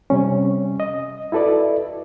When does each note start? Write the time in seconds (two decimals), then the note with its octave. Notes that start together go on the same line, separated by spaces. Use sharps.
0.10 C3 G3 C#4
0.80 D#5
1.32 E4 F#4 A4 B4 D5